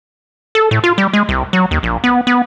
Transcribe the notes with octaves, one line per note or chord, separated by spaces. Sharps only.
A4
A2
F4
G3
G#3
C2
F#3
D#2
A#1
B3
B3